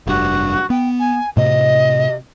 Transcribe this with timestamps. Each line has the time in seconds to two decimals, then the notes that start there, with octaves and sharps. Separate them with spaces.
0.07 F1 G2 F#4
0.70 B3 G5
0.99 G#5
1.37 A2 C3 D#5